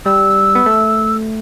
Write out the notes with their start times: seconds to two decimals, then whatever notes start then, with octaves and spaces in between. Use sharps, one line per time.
0.06 G3 E6
0.55 B3
0.66 A3